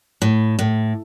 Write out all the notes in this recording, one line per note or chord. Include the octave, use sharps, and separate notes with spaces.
A2
A2